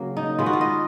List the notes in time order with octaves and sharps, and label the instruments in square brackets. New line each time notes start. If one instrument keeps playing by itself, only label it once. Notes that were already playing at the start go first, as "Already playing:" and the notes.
Already playing: [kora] C#3 F#3 A#3
D#4
D#3 G#3 B3 F4
F#4
F4
D#5